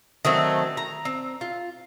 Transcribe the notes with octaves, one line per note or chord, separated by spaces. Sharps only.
D#3 F#3 A3 C4
A#5
C4
F4